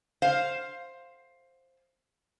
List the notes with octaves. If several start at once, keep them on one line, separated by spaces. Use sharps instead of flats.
C5 F5